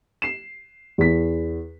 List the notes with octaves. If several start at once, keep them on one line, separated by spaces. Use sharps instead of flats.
C7 E7
E2 B6